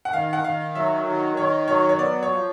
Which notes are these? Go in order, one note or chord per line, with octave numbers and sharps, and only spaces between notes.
F#5
D#3 F5
F#5
D#3 F5
F#3 E5
D#3
D#3 C#5
F#3 C#5
C#5
B3 D5
C#5
F3